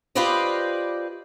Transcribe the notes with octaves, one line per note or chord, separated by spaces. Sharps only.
F4 G4 B4 C5 D5 D#5